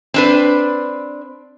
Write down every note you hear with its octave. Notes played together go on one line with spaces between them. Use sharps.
C4 D4 B4